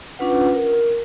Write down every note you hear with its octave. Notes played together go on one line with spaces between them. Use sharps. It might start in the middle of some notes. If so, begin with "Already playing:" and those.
C#4 D4 F4 B4 F#5
A#4